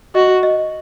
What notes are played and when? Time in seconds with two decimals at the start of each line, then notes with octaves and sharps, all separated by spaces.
0.15 F#4 D#5
0.43 D#5